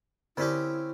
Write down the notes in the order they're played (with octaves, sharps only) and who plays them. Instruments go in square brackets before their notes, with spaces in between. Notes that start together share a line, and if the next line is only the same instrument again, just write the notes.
[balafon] D3 D5 [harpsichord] C4 C#4 G4 [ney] E4